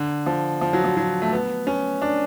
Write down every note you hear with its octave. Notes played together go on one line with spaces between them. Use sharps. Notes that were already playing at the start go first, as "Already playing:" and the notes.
Already playing: D3
F3
F3
F#3
F3
F#3
A3
B3
C#4
D4